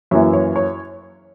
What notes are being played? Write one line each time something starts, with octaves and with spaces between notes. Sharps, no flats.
F#2 E3 A#3 C#5 E5
C#5
C#5